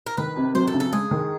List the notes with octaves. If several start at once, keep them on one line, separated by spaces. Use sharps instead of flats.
A#4
D#3 B4
C3
F#3 C5
A4
C#3
A4
G#3 G#4
D#3